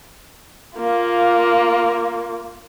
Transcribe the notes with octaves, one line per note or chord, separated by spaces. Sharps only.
A#3 F4